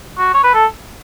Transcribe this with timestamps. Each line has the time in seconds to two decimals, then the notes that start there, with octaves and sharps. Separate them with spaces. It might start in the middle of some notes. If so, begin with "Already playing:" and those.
0.18 F#4
0.34 C#5
0.44 B4
0.54 A4